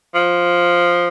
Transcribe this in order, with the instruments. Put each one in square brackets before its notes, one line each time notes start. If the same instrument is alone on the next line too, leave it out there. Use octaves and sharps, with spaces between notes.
[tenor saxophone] F3